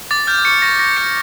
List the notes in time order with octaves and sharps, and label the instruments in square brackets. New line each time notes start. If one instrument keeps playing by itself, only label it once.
[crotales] D6 A6
F6 G6
C#6 C#7
C#6 A#6
C#6 A#6
F6 C#7